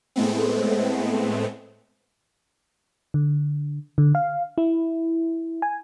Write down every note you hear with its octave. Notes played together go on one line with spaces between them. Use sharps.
A2 G#3 A3 B3 C4
D3
D3
F5
E4
G#5